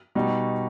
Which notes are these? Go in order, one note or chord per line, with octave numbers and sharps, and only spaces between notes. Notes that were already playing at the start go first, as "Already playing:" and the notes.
B2 G3 D#4 F#4